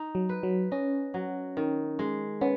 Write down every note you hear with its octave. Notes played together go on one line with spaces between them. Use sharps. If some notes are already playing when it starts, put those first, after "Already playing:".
Already playing: D#4
F#3
B4
F#3
C#4 D#5
F#3
D#3
G#3
B3 C#4